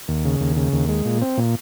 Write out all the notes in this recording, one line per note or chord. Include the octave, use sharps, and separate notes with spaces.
D#2
C#3
D#2
C#3
D#2
G#3
A#2
C4
A#2